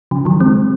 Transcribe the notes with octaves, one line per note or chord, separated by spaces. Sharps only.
C#3 F3
D#3 F#3
G#3 C4